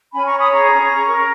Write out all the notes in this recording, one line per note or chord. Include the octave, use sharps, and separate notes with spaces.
C#4 G#5 B5
A#5 C#6
C#5
B5 D#6
G#4 A#5 C#6
C#4
C#4
A#4